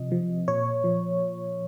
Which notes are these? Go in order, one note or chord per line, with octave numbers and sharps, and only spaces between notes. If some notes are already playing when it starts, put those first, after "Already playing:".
Already playing: C3 F3 D#5
F3
A#2 C#5
F3